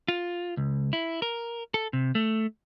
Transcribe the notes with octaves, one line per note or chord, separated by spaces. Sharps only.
F4
C#2
E4
A#4
A4
C3
A3